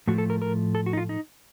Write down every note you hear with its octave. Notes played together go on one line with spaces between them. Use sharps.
A2 F3 A3 F#4
A4
A#4
A#4
A4
F#4
D#4
F4
D#4